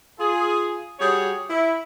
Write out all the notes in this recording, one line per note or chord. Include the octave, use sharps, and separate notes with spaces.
F4 G#4
G3 F#4 G#4 C#5
E4